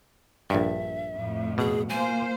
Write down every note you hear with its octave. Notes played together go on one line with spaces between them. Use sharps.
A#1 G2 E5
F2 A2
B2 G#4
A#3 F4 C5 G#5